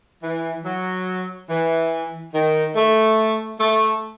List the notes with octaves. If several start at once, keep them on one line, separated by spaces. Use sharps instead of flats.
E3
F#3
E3
D#3
A3
A3